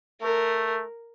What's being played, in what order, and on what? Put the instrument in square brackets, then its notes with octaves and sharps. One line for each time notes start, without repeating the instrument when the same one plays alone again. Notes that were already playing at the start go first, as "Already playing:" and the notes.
[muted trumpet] A3 [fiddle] A#4